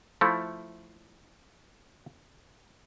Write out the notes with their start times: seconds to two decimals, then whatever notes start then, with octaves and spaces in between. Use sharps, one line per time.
0.21 F3 A3 E4